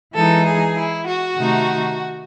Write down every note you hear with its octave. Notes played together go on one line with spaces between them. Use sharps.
E3 G#3 D#4 A4
G#4
E4
F#4
C3 D#3 A3 D#4